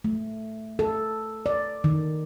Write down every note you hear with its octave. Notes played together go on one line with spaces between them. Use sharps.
A3
A4
D5
D#3